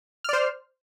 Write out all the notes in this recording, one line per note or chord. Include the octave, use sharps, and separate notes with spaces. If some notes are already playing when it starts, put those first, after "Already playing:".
C5 D5 F6